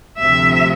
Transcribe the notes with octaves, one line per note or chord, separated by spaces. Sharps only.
D2 C3 F3 E5